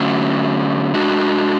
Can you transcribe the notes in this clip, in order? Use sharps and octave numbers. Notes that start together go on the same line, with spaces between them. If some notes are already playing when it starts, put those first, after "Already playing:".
Already playing: D3 F#3 A3 C#4
G#3 D4 F#4